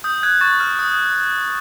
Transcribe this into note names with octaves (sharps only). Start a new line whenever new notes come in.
D#6 G6
F#6 G#6
C#6 A6
F6
D#6